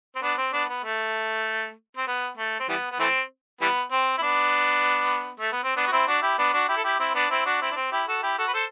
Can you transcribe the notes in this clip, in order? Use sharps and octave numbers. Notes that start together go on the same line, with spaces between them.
C4
B3 D4
C4
B3 D4
B3
A3
C4
B3
A3
C4
E3 G3 B3
B3
E3 A3 C4
E3 G3 B3
C4
E4
B3 D4
A3
B3
C4
B3 D4
F#4
C4 E4
D4 F#4
E4 G4
B3 D4
D4 F#4
E4 G4
A4
E4 G4
C4 E4
B3 D4
C4 E4
D4 F#4
C4 E4
D4
C4
E4 G4
F#4 A4
E4 G4
F#4 A4
B4
A4 C5